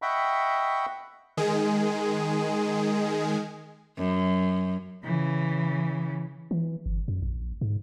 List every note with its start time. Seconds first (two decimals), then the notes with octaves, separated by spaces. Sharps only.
0.02 D#5 E5 F#5 G5 B5 C#6
1.37 D#3 G#3 G#4
3.98 F#2
5.04 C#3 E3
6.51 E3
6.86 G1
7.08 F#2
7.22 A#1
7.61 G#2